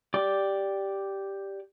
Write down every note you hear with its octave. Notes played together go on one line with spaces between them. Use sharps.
G4 D5 D6